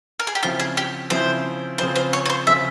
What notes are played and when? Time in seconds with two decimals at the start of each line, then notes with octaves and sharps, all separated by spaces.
0.20 A#4
0.27 G#4
0.35 G4
0.43 C#3 F3 C4 E4 F4
0.60 G#4
0.77 G4
1.10 C#3 F3 C4 E4 C5
1.78 C#3 F3 C4 F4 C5
1.96 C5
2.13 C#5
2.26 C#5
2.30 C5
2.47 C#3 F3 C4 F4 E5